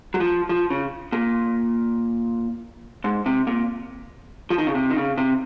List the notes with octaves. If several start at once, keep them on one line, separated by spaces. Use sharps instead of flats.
F#3
F3
F3
C#3
A#2
G#2
C3
A#2
F3
D#3
C#3
C3
D#3
C#3
C3